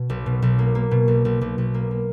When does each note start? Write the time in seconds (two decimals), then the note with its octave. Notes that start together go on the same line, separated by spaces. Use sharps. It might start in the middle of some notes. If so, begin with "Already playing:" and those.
Already playing: B2
0.10 B1
0.26 B2
0.42 B1
0.59 A#3
0.75 A#3
0.91 B2
1.08 B1
1.25 B1
1.41 B1
1.58 B1
1.74 A#3
1.91 A#3